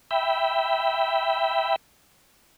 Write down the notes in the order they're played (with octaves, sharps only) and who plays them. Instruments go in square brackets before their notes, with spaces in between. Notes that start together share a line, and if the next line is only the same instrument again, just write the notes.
[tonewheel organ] E5 G5 B5